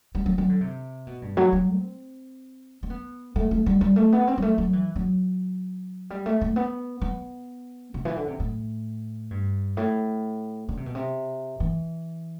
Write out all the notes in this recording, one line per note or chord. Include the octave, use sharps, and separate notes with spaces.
G3
F#3
F#3
D3
C3
B2
G2
F#3
F#3
C4
C4
B3
A3
A3
G3
G3
A3
B3
C4
G3
A3
F#3
E3
F#3
G3
A3
A3
B3
B3
C3
E3
D3
C3
A2
G2
A2
D3
C3
B2
C3
E3